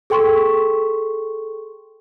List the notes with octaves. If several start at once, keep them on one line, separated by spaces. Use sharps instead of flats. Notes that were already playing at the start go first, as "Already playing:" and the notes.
G#4 A4 G5 C6 C#6